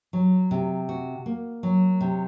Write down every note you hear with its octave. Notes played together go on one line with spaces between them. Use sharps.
F#3
C3
F#4
A#3
F#3
C3